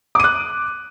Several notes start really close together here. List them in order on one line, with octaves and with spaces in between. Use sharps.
D6 D#7 F#6